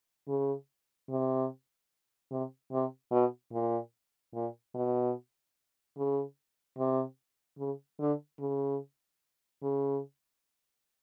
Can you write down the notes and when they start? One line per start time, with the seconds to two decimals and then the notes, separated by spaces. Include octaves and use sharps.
0.28 C#3
1.09 C3
2.31 C3
2.72 C3
3.12 B2
3.53 A#2
4.34 A#2
4.74 B2
5.97 C#3
6.78 C3
7.58 C#3
7.99 D3
8.39 C#3
9.62 C#3